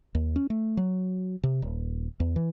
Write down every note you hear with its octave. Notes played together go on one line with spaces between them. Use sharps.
D#2
C#4
A3
F#3
C3
D#1
E2
E3